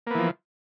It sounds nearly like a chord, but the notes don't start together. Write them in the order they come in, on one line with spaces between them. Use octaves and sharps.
A#3 B3 E3 F3